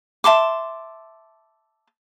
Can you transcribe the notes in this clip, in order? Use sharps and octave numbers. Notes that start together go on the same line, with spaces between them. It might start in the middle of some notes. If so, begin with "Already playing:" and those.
E5 A5 C6 D6